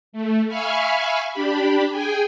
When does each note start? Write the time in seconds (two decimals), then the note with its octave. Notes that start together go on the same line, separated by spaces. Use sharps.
0.13 A3
0.47 E5 F5 G#5 B5 C#6 F6
1.32 D4 G4 B5
1.90 G#4 G5 G#5